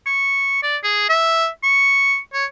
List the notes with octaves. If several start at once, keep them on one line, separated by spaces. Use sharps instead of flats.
C#6
D5
G#4
E5
C#6
C#5